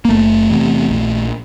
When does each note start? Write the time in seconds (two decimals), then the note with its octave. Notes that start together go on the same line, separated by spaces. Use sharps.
0.05 A#3
0.09 F#1 A3
0.49 E2 C3
0.90 A#1